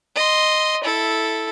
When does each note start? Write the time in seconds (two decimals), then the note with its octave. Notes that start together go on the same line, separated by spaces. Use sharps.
0.15 D#5 C6
0.84 E4 A4